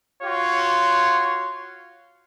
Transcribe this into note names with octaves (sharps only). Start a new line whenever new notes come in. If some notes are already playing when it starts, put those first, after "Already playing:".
F4 F#4 C#5 C6